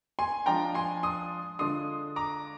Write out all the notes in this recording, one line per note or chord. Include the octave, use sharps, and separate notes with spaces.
G#5 C6
F3 G#3 D4 F4 G5 A#5
G#5 C6
C6 D#6
D3 G#3 D4 F4 C6 D#6
A#5 D6